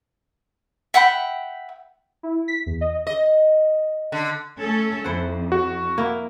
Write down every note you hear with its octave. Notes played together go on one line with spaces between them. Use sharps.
E5 F#5 G5 B5
E4
B6
E2
D#5
D#5
D3
A3 C#4 A4
F2 E4 C5 F#5
F#4
A#3 E4